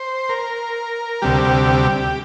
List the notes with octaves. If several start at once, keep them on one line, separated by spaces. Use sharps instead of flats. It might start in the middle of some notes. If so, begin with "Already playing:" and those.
Already playing: C5
A#4
D2 C3 G3 G4